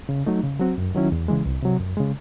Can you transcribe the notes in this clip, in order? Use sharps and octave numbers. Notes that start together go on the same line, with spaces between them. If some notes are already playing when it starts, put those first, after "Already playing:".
C#3
F#3 A3 D#4
C#3
F#3 C4 F#4
F#2
D#3 F#3 C#4 E4
E2
C#3 E3 G#3
C2
C3 F#3
F#2
C#3 G#3